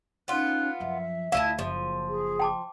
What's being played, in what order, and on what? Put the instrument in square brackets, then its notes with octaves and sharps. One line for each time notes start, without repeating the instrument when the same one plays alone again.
[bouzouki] B3 F4 [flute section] C#4 D#4 F#6
[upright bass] F#2 F3 [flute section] E5
[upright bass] D2 F4 [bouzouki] E4 D#5 A5 [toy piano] F5
[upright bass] F#1 [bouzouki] F3
[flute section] G#4
[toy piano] G5 A5 D6